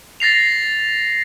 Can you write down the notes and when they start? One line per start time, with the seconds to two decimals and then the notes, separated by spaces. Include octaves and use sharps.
0.20 A6 A#6 C7 F7